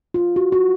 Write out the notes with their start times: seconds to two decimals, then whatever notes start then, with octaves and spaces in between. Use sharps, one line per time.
0.14 F4
0.36 F#4
0.52 F#4